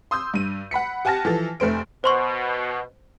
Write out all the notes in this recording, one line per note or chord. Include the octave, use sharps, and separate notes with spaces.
C6 D#6 E6 G6
G2 D#7
F#5 B5 B6 C#7
G4 F#5 G#5 A5 F6 A#6
E3 F3 A4
F1 A3 C5 D7
B2 C5 C6 C#6